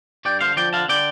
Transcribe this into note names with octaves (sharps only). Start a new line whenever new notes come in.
G2 D5 G5
D3 C5 F5
F3 D5 G5
D3 F5 A5
D3 D5 G5